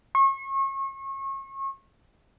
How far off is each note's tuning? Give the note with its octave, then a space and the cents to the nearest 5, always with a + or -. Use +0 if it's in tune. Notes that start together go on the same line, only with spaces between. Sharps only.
C#6 -35